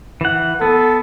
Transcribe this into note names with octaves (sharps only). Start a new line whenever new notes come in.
E3 F#5
B3 A4